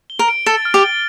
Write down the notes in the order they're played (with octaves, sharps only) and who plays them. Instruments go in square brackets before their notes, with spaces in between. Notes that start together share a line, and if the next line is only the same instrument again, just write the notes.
[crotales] G7
[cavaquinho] A#4
[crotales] D7
[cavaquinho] A4 [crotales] A6
[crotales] F6
[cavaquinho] G4
[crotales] G7